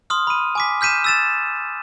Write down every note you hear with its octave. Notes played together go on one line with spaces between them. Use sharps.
C6 D#6 F6
B5 D#7
G#5 D6 B6
F6 G6 B6 D#7 E7
E6 A6 E7